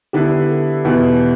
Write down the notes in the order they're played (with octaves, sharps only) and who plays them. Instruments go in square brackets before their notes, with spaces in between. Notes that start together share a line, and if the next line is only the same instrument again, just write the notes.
[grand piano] D3 B3 E4 B4 [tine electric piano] G4
[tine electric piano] A4
[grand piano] E2 B2 B3 E4